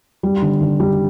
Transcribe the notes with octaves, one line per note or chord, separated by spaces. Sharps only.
G3
D3
D3
G3